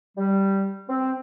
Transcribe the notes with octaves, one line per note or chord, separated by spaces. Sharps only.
G3
C4